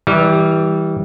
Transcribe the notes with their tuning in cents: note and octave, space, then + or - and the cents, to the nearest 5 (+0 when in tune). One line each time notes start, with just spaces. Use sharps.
E3 -25 G3 +0